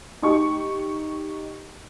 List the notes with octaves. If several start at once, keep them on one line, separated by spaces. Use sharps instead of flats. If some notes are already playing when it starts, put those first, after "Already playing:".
D#4 G4 C#6